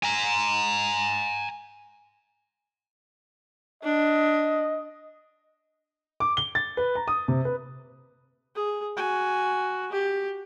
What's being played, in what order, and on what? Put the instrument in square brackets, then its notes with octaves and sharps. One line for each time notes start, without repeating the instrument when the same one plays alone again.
[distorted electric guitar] G#5 A#5
[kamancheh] D4 [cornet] D#5
[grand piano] D6
G7
A6
B4
A#5
D#6
C3
B4
[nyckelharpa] G#4
F#4 G#5
G4